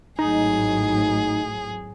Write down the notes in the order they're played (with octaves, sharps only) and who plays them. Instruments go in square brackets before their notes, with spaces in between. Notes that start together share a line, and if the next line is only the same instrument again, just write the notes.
[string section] G#1 A2 F#3 [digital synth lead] D#4 [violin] G#4